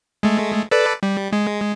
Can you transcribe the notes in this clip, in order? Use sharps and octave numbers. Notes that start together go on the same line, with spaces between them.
G#3 A3
A4 B4 D5
G3
G#3